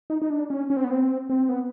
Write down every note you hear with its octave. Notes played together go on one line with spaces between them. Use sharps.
D#4
D#4
D4
C#4
C#4
C4
B3
C4
C4
B3